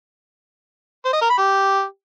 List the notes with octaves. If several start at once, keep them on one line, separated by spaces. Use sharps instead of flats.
C5
D#5
A#4
B5
G4